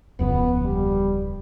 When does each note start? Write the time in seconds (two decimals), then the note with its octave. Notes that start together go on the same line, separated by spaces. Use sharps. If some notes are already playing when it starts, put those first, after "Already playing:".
0.19 D1 F2 C#3 B3
0.65 G3